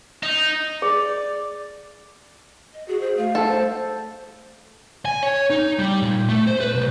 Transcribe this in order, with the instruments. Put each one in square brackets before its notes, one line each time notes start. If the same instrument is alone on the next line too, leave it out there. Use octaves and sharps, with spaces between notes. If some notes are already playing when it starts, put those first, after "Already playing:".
[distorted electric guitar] D#4
[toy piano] G#4 [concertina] D5
[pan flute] D#5
[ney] F#4 [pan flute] G#4
[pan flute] G#4 [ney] C5
[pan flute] A3 [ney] F5
[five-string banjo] A4
[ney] C5
[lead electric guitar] G#5
C#5
D#4
G3
A#2
A3
C5
B4
B1